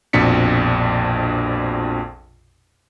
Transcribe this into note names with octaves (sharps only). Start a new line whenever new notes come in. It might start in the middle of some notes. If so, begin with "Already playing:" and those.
A#1 F2 B2 D4 B6 C#7